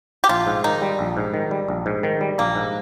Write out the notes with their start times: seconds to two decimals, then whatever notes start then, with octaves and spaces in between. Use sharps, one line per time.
0.24 G4
0.29 A#1 F4
0.47 G#2
0.64 D#3 D#4
0.82 G3
0.99 A#1
1.17 G#2
1.34 D#3
1.51 G3
1.68 A#1
1.86 G#2
2.03 D#3
2.21 G3
2.38 A#1 A#3
2.56 G#2